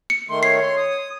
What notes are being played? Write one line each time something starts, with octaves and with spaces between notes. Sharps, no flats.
C#7
D#3 A3 C6
C#5 C7
C6
D#6